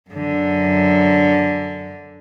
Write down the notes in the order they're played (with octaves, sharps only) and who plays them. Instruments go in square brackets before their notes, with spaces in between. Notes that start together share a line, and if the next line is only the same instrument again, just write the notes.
[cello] F#2 D3